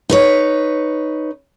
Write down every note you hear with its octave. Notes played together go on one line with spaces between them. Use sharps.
D#4 B4 C#5